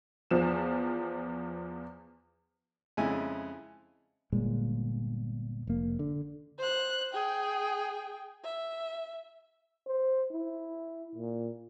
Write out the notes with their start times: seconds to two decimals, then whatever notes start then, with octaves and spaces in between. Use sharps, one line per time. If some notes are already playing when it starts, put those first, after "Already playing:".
0.31 E2 F3 E7
2.97 F2 C#3 G#3 E4 G#5
4.32 G1 A#2 G#3
5.67 F1 A#3
5.99 D3
6.58 C5 F#6
7.13 G#4 G5
8.44 E5
9.87 C5
10.32 E4
11.15 A#2